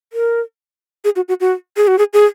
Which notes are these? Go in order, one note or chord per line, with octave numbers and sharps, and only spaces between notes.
A#4
G#4
F#4
F#4
F#4
G#4
F#4
G#4
G#4